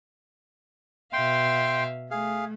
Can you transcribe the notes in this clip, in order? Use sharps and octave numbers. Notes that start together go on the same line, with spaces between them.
B2 E5 F5 G5 C6
A3 G#4 F5